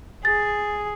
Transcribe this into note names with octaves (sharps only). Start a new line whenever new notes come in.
G#4 A6